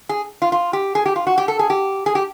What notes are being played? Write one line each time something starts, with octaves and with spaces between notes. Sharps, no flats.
G#4
F4
F4
G4
G#4
G4
F4
F#4
G4
A4
G#4
G4
G#4
G4